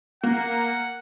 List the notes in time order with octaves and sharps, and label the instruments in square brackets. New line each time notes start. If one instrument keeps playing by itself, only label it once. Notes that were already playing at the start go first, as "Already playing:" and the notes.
[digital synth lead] A#3 [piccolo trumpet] F#5